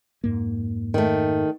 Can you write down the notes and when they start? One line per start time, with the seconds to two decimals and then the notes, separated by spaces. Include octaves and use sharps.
0.24 F2 G#2 A#3
0.94 D#3 A3